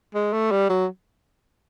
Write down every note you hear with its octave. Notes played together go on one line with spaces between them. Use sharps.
G#3
A3
G3
F#3